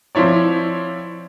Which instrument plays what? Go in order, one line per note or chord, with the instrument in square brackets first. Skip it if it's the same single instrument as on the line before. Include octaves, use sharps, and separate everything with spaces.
[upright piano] F3 C4 E4 C#5 D5